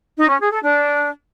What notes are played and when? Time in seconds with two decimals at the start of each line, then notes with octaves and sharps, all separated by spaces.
0.17 D#4
0.28 C#4
0.40 G#4
0.51 A4
0.63 D4